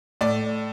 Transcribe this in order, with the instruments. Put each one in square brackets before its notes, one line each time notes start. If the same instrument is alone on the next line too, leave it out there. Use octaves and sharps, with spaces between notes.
[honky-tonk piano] A2 D5